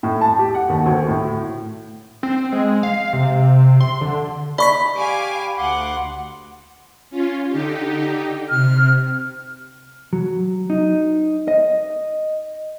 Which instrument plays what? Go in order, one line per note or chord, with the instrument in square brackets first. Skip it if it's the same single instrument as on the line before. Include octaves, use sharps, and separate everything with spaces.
[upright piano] A2
A5
G4
F#5
D#2
D2
A2
[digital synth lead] C4
G#3
F5
C3
C6
D3
[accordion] D#4 [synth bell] D5 C#6 B6 [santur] B5
[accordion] G4 [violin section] F5 G#5 D6
[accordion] D2 C6 D6 [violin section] F#5
[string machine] C#4 F4
D3 D#4 G4
[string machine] C3 [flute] F6
[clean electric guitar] F#3
D#4
D#5